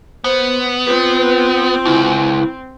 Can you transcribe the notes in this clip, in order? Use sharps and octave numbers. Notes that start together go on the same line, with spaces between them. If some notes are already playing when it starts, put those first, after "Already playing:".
B3 C5
C4 F4 B4
C#2 E4